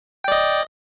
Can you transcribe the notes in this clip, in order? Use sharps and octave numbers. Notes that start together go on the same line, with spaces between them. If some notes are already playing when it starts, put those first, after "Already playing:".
D5 D#5 G5